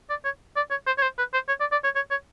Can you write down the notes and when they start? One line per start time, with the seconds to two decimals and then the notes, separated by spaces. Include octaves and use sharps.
0.10 D5
0.25 C#5
0.56 D5
0.71 C#5
0.87 C5
0.98 C#5
1.02 C5
1.18 B4
1.34 C5
1.48 C#5
1.60 D5
1.72 D5
1.84 C#5
1.96 C#5
2.11 C#5